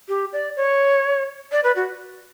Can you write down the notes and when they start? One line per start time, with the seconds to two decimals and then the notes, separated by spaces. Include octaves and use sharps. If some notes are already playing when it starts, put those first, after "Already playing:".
0.09 G4
0.33 D5
0.56 C#5
1.52 D5
1.64 B4
1.76 F#4